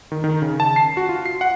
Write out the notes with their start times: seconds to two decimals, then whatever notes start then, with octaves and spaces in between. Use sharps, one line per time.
0.12 D#3
0.24 D#3
0.42 C#3
0.60 A5
0.76 C7
0.97 F#4
1.09 F4
1.26 C7
1.41 F#5